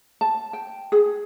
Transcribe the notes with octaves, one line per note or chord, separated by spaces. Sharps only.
A5
G5
G#4